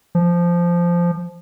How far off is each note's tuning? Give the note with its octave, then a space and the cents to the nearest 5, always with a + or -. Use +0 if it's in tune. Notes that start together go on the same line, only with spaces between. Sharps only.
F3 -10